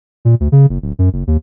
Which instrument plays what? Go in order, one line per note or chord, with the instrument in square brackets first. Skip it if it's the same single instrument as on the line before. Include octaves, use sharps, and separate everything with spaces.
[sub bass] A#2
D2
C#3
F#1
D1
F#2
F#1
D#2